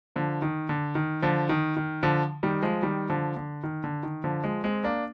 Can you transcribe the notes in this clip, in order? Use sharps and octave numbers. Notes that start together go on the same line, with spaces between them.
D3 F3
D#3
D3
D#3
D3 F3
D#3
D#3
D3 F3
D#3 G3
F3 G#3
D#3 G3
D3 F3
D3
D#3
D3
D#3
D3 F3
F3 G#3
G#3 C4
A#3 D4